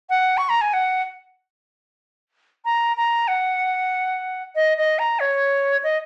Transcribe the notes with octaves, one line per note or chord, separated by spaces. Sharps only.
F#5
C#6
A#5
G#5
F#5
A#5
A#5
F#5
D#5
D#5
A#5
C#5
D#5